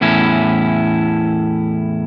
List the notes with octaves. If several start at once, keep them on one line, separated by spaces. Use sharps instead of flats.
E2 A2 C#4 E4